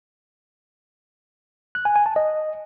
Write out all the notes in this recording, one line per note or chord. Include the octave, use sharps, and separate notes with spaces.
F#6
G#5
G#5
A5
D#5